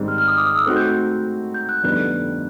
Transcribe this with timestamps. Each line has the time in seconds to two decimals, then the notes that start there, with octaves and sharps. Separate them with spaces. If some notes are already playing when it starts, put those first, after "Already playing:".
Already playing: G#2 D#3 G3 C4
0.08 F6
0.18 F6
0.28 D#6
0.38 D6
0.46 D#6
0.56 E6
0.66 A3 C4 D#4 F#4 F#6
0.76 G6
1.54 G6
1.69 F#6
1.83 F2 D3 G3 B3 D#4 F#6